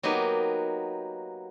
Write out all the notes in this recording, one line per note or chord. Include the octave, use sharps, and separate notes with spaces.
F#3 A#3 B3 D#4 G4